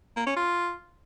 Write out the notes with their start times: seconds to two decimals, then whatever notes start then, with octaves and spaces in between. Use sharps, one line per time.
0.17 A#3
0.27 C#4
0.37 F4